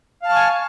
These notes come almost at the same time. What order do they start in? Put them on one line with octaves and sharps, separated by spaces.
F5 A5 F6 C#6 G#5